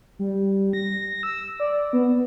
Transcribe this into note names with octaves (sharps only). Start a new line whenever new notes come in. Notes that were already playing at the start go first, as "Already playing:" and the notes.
G3
A#6
E6
D5
B3